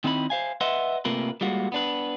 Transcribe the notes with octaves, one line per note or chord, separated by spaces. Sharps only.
D#3 C4 D#4 E4 F5 B5
C5 F5 G#5
B4 D#5 E5 F#5 C6
C3 A3 A#3 F4 A#4 B4
G3 G#3 A#3 F4 F#4
B3 D4 B4